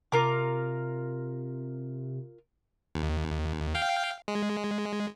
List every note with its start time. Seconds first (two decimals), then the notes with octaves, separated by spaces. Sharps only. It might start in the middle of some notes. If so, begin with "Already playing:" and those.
0.12 C3 F4 A#4 D6
2.95 D#2
3.75 F5 G5
4.28 G#3